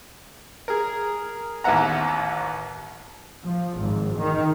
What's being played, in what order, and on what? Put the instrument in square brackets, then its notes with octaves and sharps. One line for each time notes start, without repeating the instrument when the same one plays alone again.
[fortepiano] G#4 A#4
A1 D#2 B3 E5 F#5 A#5
[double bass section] F3
G#1
D#3